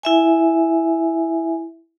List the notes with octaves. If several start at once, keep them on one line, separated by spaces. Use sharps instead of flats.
E4 E5 G#5